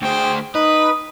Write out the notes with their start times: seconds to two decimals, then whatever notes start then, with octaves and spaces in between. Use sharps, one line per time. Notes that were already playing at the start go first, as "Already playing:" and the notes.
0.02 D2 G#4 C5 G5
0.55 D#4 B4 D#6